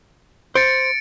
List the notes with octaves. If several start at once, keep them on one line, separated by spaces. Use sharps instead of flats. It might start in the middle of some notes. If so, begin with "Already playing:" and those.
C5 A6 C#7 D7